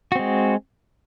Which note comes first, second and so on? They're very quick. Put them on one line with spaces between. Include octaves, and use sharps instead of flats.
F#4 C4 G#3